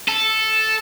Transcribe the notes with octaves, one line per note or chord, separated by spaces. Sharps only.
A4